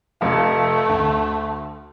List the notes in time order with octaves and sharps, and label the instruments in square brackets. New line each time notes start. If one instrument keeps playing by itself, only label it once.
[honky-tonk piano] F1 F5 [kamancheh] A3
[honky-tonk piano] D2